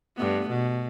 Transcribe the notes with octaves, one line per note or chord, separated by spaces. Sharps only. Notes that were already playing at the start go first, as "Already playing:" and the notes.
G2 A3 B3
B2